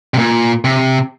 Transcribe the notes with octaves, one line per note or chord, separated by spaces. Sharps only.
C3
A#2
C3